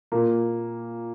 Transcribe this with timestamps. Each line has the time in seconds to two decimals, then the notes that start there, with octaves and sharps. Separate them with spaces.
0.12 A#2 A#3